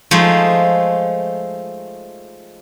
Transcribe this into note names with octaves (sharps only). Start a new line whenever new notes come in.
F3 G#3 A3 D#4